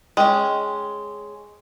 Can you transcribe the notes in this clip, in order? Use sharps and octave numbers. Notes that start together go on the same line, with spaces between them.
G#3 C#4 G5